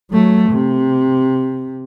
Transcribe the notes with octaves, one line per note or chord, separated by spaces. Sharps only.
F#3 A3
C3